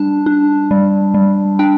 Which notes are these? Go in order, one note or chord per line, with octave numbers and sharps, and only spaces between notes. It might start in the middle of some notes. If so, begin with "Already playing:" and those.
Already playing: G3 D4 A5
D4
G3
G3
D4 G5